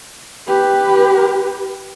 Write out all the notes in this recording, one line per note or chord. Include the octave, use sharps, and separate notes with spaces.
G4 B4